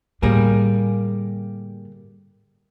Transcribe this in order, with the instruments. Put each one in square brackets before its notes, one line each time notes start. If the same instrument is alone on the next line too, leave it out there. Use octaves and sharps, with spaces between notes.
[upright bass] A2 D3 [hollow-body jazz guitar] G3 A#3 G#4